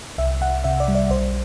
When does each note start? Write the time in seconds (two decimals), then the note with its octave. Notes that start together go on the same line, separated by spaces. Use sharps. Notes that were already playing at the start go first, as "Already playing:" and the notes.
0.18 C2 E5
0.41 C2 F#5
0.64 C3 E5
0.80 D5
0.88 G3
0.95 D5
1.10 B1 C5